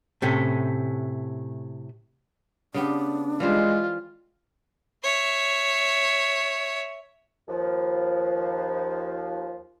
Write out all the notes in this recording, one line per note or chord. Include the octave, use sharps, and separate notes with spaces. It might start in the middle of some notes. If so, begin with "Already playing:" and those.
A2 C3 A3 C#4
C#3 B3 D4 G4
E3 G3 G#3 F4 C5
C#5 E5
D#2 F3